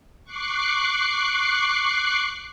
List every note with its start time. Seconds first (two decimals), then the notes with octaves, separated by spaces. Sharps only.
0.24 C#6 D6 F#6 C7